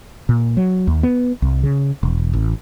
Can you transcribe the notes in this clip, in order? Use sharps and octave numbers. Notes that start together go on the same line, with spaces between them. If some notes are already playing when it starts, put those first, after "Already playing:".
A#2
F#3
D#2
B3
C2
C#3
E1
A1